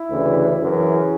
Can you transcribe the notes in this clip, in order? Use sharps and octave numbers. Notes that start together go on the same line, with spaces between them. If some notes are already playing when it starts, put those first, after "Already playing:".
Already playing: E4
D2 C#3 E3
F#2 E3 G#4